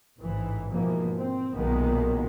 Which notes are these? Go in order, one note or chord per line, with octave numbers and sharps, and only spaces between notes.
A1 G#2 E3
G#2 B2 E3 F3 A#3
C4
B1 A#2 D#3 G#3 A#3 B3